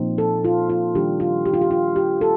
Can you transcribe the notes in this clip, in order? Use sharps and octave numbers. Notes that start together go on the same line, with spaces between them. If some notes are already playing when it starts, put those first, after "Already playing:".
Already playing: A#2 F3 C4 D#4
A4
F4
F4
D#3 G3 D4 G4
F4
G4
F4
G4
F4
G4
A4